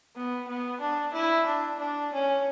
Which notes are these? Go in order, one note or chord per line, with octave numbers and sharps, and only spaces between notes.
B3
B3
D4
E4
D4
D4
C#4